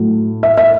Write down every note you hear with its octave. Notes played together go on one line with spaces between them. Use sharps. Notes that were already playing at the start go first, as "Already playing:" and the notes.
Already playing: A2 F#3 A3
E5
E5